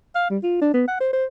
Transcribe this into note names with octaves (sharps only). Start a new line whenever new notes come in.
F5
G3
F4
D4
B3
F#5
C5
C5